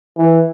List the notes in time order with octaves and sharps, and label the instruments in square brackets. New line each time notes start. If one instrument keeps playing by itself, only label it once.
[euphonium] E3